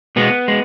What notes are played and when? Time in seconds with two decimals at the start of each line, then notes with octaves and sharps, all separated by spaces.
0.16 B2 G#3 B3
0.48 G#3